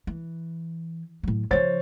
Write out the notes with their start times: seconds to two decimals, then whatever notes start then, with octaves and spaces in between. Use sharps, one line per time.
0.07 E3
1.23 A2 F#3
1.51 C#3 F3 C5 C#5 A6